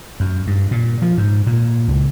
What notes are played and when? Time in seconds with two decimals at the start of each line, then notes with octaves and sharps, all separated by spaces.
0.20 F#2
0.47 G2
0.71 A#2
1.02 F3
1.18 G#2
1.47 A#2
1.88 C#2